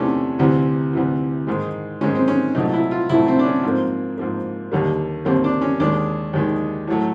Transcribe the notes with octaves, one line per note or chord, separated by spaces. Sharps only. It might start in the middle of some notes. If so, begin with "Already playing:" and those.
Already playing: E2 C3 E3 A3 C#4 D4
D2 C3 E3
D2 C3 E3
G#2 D#3 G#3
G#2 D#3 G#3 C#4
C4
C#4
C2 A#2 F#3 A3 D#4
E4
F4
C2 A#2 F#3 A3 E4
C4
D4
C#4
G#2 F3 A#3 C4
G#2 F3 A#3
D#2 D3 G3 A#3
D#2 D3 G3 A#3 C4
D4
C#4
D#2 D#3 G#3 D4
D#2 D#3 G#3
A2 F#3 A3